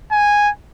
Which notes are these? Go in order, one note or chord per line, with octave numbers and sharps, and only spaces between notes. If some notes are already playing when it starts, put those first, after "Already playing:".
G#5